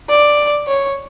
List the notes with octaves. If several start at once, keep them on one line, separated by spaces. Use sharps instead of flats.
D5
C#5